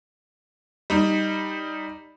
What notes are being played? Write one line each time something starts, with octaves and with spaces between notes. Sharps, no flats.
G3 D#4